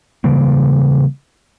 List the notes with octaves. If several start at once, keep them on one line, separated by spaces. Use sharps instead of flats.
C#3 E3 G3 A#3